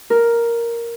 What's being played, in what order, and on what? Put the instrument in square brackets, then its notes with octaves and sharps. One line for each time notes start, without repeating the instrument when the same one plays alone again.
[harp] A#4